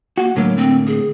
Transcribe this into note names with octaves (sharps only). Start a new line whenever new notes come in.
A#3 F#4
A2 D3 F#3 A#3
C4
G#4